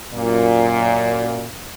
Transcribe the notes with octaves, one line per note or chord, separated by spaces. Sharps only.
F#2 A#2